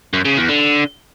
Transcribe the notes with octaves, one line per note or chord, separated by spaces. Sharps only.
F#2
C#3
E2
D3